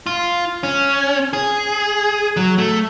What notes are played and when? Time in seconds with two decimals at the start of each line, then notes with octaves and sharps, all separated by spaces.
0.06 F4
0.63 C#4
1.33 G#4
2.37 F#3
2.58 A3